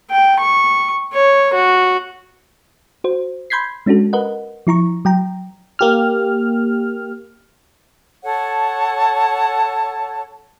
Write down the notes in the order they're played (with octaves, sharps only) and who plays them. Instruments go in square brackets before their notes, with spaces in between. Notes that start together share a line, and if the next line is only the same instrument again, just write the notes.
[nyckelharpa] G5
C#6
C#5
F#4
[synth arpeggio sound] F#4 C5
B5 C6 G6 G#6 B6 C7
G#3 C#4 D4 F#4 A4
A#4 B4 D#5 F#5
F3 E4 A#5 C#6
F#3 G5 A#5
[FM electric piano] A#3 G4 F6
[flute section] A4 C#5 F#5 A5